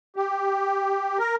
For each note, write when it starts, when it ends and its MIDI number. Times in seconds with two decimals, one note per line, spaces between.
0.16 1.18 67
1.18 1.35 70